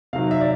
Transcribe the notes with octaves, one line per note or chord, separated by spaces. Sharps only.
C3 D#3 F#3 F5
E5
D5